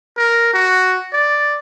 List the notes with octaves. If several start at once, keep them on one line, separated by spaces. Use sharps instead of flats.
A#4
F#4
D5